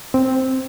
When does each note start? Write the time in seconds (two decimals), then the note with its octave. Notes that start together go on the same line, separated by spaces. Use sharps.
0.14 C4